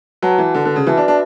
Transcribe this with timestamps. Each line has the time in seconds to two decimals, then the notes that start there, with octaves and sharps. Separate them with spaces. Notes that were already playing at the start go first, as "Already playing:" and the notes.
0.22 F#3 F#4 B4 F#5 A5
0.38 E3
0.55 D3
0.65 D3
0.76 C#3
0.87 E3 F#4 B4 E5 A5
0.97 D4
1.08 D4